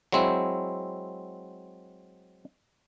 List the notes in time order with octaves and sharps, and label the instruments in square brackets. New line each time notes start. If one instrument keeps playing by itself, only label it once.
[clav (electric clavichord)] F#3 G#3 C4 E4